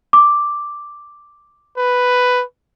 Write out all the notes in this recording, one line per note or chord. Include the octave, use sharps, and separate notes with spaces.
D6
B4